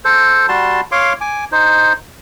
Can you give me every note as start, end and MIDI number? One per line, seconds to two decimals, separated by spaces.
0.05 0.46 69
0.05 0.46 72
0.48 0.81 55
0.48 0.81 66
0.48 0.81 81
0.48 0.81 84
0.92 1.13 73
0.92 1.13 77
0.92 1.13 84
0.92 1.13 86
1.21 1.45 80
1.21 1.45 86
1.52 1.93 63
1.52 1.93 72